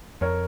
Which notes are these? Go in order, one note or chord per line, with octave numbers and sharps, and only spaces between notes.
F2 A#4 C#5